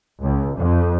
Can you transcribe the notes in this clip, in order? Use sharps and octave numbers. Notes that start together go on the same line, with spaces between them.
C#2
F2